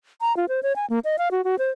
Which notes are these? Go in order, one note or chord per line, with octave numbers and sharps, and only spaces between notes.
A#5
F4
C5
C#5
G#5
A#3
D#5
F5
F#4
F#4
C5